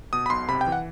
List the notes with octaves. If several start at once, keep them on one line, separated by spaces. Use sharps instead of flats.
B2 D#6
B5
B1 C6
C3 B5
G5
E3
F#5